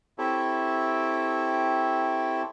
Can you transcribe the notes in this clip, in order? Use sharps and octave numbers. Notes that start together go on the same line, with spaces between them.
C4 E4 G4 A4 C#5 E5